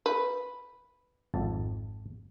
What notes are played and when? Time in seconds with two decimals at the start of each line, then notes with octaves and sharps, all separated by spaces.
0.06 B4
1.34 G#1 F2 A5